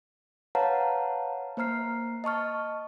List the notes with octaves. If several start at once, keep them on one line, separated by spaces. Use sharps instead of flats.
B4 C#5 F5 F#5 A5 A#5
A#3 C5 A#5 F6 C7
D#5 A5 C#6 F6